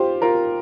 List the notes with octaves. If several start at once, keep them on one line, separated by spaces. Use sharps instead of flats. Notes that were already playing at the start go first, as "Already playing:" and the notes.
Already playing: F4 G4 C5
F4 A#4